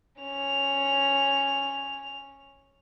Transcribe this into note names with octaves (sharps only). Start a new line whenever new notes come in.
C#4 F7